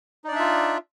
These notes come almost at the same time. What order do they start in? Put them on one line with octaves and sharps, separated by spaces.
D#4 D5 D4 E5 F4